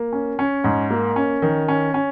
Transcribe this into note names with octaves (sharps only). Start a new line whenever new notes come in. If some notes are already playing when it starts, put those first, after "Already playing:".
Already playing: A#3
C#4
C#4
G#2
A#3
C#4
D#3
C#4
C#4